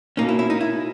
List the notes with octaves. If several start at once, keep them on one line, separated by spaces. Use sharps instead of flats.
B2 A#3 C#4 D#4
E4
E4
D#4
E4